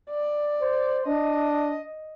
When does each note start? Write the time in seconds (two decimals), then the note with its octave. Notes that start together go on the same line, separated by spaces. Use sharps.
0.11 D5
0.61 C5
1.06 D4 D#5